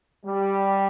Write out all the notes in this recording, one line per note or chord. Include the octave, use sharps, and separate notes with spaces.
G3